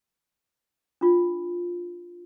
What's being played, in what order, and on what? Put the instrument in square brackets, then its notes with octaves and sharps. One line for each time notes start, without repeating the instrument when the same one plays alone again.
[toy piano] D4 F4